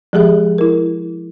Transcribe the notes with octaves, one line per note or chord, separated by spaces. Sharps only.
F3 G#3 G4 G#4 E5
E4 A#4